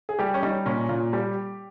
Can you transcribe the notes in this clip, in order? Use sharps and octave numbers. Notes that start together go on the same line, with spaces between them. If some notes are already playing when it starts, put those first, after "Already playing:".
G#4
G3 G4
C#4
G3 D#4
A#2 C#4
A#2 F4
G3 G4